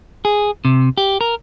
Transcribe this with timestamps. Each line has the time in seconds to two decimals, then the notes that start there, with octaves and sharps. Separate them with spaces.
0.25 G#4
0.65 C3
0.98 G4
1.21 A#4